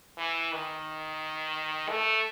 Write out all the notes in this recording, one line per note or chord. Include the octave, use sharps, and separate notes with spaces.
E3
D#3
A3